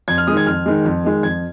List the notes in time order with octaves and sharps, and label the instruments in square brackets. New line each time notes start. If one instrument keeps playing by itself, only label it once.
[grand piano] F2 G#6
F6
D#3 G#3 D#6
G#6
F2 F6
D#3 G#3
F2
D#3 G#3
F2 G#6